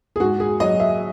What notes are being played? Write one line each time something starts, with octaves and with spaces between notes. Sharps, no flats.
G#4
G#2 F#4
G#4
F#3 D#5
E5